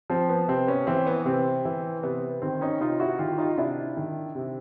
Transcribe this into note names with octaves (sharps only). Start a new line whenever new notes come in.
F3 C4
B3
C3 C4
B3 C#4
E3 C4
B3
C3 C4
E3
C3 B3
D#3 C4
C#4 D#4
C3 D#4 F4
E4 F#4
D#3 F4 G4
D#4 F4
C3 D4 E4
D#3
C3